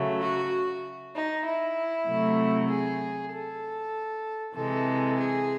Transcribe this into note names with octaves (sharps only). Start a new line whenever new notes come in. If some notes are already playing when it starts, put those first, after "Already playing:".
Already playing: C#3 F#3 A3
F#4
D#4
E4
C3 F#3 A3
G#4
A4
C3 E3 G#3 A4
G#4